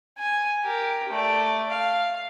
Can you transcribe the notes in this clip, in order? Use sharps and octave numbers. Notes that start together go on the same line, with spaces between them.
G#5
G4 A#4
A3 D5
F5